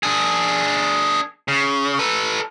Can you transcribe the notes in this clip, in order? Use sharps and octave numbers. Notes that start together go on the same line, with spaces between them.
D4 G#4
C#3
A4 B4